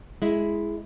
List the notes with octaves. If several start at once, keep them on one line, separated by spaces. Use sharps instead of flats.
G#3 E4